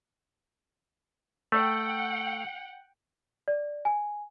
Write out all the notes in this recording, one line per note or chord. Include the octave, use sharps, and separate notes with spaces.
A3 F#5 G5
D5
G#5